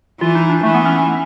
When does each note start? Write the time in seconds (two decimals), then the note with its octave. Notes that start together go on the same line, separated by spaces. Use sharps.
0.21 E3 F4
0.35 D#4
0.50 D4
0.63 E3 A3
0.74 B3
0.85 C#4
0.96 C#4